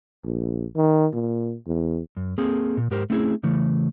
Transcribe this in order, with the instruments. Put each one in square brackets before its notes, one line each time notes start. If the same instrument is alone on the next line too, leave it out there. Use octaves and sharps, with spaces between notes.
[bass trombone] A#1
D#3
A#2
E2
[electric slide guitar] F#2
A#3 C4 G#4 A4
A#2
G#2 G4 A#4 C5
A3 C4 C#4 E4 G4 G#4
C#3 E3 A3